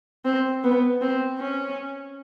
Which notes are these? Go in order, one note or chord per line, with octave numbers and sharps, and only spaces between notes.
C4
B3
C4
C#4